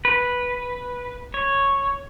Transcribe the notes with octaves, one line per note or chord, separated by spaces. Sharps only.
B4
C#5